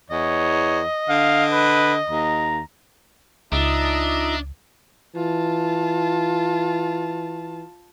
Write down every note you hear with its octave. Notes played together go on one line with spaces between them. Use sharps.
E2 C#5 D#5
D3 F5
B4
D#2 A#5
C#2 D4 D#4 F4 D#5 E5 A#5 D#6
E3 F4 A5